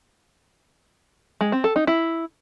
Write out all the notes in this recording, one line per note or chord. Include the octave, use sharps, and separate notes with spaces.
G#3
C4
A4
D#4
E4